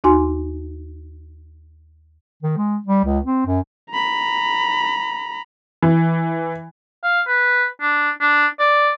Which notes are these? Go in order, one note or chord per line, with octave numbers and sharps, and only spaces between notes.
D#2 D#4 F#4 G#5 C6
D#3
G#3
G3
C#2
C4
F#2
A#5 B5
E3
F5
B4
D4
D4
D5